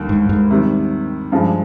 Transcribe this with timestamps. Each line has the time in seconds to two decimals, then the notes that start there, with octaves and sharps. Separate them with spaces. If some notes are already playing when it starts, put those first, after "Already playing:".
Already playing: D#2 D3 G3
0.09 G#2
0.29 G#2
0.51 C3 D#3 G3
1.32 G2 F3 G#3